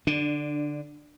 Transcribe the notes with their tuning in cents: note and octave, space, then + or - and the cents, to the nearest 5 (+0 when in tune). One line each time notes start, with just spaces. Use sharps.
D3 +0 D4 +20